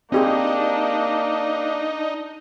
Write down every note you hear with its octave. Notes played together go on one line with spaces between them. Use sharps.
A#3 C4 D4 D#4 G4 G#4